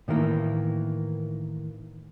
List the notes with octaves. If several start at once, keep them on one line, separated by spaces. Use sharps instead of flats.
A2 D#3 E3 A#3